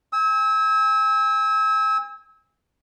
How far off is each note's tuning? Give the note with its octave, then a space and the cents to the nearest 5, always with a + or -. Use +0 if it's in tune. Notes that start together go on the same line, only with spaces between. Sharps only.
G#5 -40 E6 -30